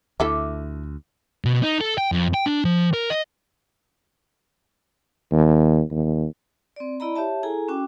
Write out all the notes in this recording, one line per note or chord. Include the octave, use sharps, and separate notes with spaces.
D2 E4 A4 E5 D6
B2
D#4
A4
G5
F2
G5
D4
F3
A#4
D#5
D#2
D#2
C4 D5
E4 D5 D#5 A#5 B5
G4 C#5 E5 A5
E4 G#4 A4 G#5 A#5
C#4 F#4 G5 D6